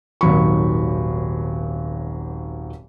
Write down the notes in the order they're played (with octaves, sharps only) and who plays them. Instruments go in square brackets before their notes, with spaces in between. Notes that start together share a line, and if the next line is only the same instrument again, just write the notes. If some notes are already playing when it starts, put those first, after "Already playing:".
[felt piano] D#1 G#1 D#3 F#3 B5 C#6